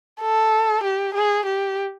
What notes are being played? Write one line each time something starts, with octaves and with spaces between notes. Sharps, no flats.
A4
G4
G#4
G4